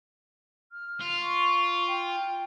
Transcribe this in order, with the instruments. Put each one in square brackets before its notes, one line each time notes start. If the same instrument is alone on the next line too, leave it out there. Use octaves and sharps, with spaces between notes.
[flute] F6
[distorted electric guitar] F4
[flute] C#6
G5